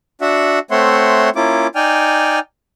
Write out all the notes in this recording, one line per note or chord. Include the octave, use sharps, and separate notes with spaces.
D4 F#4 E5 F#5
A3 C4 C#5 E5 F#5 C6
A#3 C#4 E4 F4 D6
D#4 D5 G5 G#5 F6